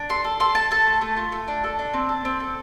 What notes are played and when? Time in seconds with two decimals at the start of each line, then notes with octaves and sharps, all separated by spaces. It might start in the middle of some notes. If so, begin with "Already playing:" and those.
Already playing: D4
0.09 A4 C6
0.24 A4
0.40 A4 C6
0.55 A4 A5
0.71 A4 A5
0.86 A3
1.01 A3
1.17 F4
1.32 A3
1.48 D4
1.64 A4
1.79 D4
1.94 C4
2.09 A4
2.25 C4
2.40 A4